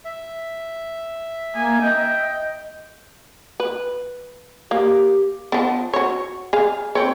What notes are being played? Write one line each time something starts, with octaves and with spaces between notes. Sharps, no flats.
E5
A#3 G#5
D#5 G5
B4
A#3 G4
F3 B3
F#4 C#5
G#4 F5
C4 C#5